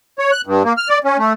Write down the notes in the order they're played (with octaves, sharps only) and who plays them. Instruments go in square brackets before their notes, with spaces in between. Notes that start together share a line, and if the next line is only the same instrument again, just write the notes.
[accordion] C#5
F#6
G2
A#3
F6
D5
C#4
A3